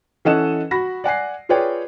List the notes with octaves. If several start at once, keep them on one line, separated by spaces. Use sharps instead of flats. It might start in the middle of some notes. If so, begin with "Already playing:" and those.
E3 C#4 A4 D#5 F#5 E7
F#4 B5 A#6
D5 F#5 G#5 C7
F4 G#4 B4 C#5 D5 G5